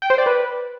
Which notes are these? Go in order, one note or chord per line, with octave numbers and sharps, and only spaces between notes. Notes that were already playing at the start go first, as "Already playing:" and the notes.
G5
C5
D5
B4